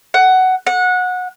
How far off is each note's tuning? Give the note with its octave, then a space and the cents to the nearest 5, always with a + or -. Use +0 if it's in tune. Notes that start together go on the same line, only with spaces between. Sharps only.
F#5 +15
F#5 -20